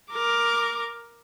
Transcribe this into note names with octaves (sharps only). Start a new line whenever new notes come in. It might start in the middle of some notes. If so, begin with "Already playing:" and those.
A#4 D6